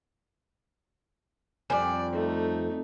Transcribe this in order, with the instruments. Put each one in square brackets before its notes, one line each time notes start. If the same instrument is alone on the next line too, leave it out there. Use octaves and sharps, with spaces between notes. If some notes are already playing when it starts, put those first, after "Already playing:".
[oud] F2 G3 [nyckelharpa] D5 [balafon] G#5
[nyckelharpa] A3 D#4